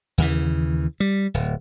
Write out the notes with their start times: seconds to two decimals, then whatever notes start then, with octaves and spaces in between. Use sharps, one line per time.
0.18 D#2 C#3 E3
1.00 G3
1.34 D1